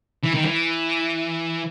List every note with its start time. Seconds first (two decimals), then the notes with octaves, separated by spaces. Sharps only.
0.24 E3
0.35 D#3
0.46 E3